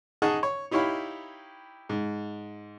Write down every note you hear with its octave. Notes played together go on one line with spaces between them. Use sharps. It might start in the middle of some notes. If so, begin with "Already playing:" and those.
D#4 G#4 D#5 F#5 A5 C#6
C#5
D#4 E4 G4 C#5 F5 B5
G#2